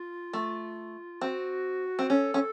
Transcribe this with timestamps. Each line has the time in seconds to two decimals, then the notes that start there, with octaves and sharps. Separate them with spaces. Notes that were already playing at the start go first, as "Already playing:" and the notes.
Already playing: F4
0.33 A3
1.21 C4 F#4
1.99 C4
2.10 C#4 A4
2.34 C#4